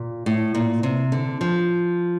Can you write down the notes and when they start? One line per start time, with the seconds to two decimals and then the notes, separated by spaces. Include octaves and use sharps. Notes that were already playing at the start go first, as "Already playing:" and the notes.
Already playing: A#2
0.26 A2
0.55 A#2
0.83 C3
1.12 D3
1.41 F3